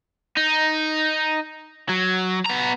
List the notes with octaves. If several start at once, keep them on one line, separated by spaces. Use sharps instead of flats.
D#4
F#3
B3 A#5